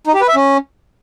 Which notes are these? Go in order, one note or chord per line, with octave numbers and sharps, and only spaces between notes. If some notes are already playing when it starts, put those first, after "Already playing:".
D#4
G4
B4
E5
C#4